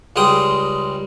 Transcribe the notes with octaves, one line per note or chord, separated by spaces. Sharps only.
C#2 G3 G#3 G5 D#6